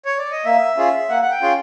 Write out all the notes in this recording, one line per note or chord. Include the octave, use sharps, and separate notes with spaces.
C#5
D5
D#5
A#3 E5
C#4 F4 G#4
A#3 F#5
F#5
G5
C#4 F4 G#4 C6